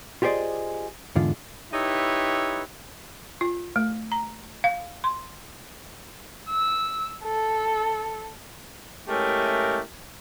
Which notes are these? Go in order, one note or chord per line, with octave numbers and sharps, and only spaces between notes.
F4 G4 G#4 C5 D5 D#5
E2 G#2 D3 F4
D#4 E4 G4 A4 B4 C#5
F4
A3
A#5
F5
C6
E6
A4
G#3 A3 C#4 E4 G4 A#4